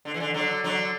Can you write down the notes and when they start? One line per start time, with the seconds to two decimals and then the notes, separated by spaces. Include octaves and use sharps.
0.05 D3
0.14 E3
0.20 D3
0.34 D3 F#3
0.64 D3 F#3